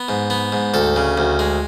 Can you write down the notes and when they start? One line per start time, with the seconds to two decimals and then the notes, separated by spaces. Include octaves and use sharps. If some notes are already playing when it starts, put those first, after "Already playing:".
Already playing: B3
0.09 G#2
0.30 B3
0.52 G#2
0.74 D2 A4
0.96 C#3
1.18 D2
1.39 G#3